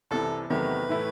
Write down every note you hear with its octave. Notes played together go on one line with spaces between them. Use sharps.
C2 C3 E3 A4
E2 C3 D#3 F#3 A3 B4
A2 E3 A3 E4